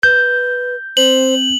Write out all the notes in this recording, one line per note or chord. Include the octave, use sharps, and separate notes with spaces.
B4 G6
C4 C5 F#7